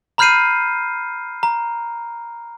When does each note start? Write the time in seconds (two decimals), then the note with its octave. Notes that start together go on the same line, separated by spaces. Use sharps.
0.18 A#5 B5 F6 G6 C7 D#7
1.43 A#5